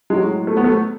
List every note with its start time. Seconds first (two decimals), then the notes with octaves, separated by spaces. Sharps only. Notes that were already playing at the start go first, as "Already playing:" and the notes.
0.10 A2 F#3 G#3
0.47 A3
0.57 B3
0.64 A3